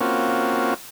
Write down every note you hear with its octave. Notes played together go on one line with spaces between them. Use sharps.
A#3 C4 C#4 F4 F#4